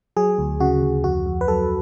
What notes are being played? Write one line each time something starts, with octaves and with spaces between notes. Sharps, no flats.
F#3 G#4
D2
C#3 F#4
D2
F2 F#4
F2
B4
F#3 A4